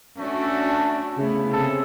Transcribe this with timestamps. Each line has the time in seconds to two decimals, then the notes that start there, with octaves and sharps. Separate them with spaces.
0.18 A3 C#4 D4 F#4
1.18 C#3 A3 B3 E4
1.52 C3 G#4 A4